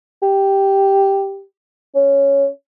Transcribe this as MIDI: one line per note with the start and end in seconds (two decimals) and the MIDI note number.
0.22 1.43 67
1.95 2.47 61